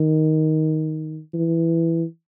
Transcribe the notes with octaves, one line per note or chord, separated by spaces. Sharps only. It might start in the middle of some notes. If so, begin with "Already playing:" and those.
Already playing: D#3
E3